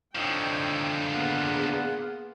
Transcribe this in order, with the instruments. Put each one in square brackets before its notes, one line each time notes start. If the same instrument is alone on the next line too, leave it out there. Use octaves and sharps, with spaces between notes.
[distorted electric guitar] D3 F3 [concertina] D#4 A4 C#5 [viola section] G5
[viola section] A#3 B3 G#4 [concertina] F4 F#5